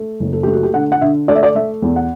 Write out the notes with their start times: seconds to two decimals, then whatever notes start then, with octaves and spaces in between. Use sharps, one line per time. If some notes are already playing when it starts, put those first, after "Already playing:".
Already playing: A3
0.20 F#1
0.33 A4
0.43 A3 G4
0.53 F#4
0.63 G4
0.74 D3 F#5
0.92 F#5
1.01 D3 E5
1.28 A3 D5
1.35 E5
1.43 D5
1.55 A3 E5
1.82 E2
1.96 F#5